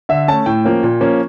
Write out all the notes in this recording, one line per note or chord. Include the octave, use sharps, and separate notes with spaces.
D3 E5
A3 C#4 A5
A2 G5
F3 A#3 C#4
A#2
F3 A#3 C#4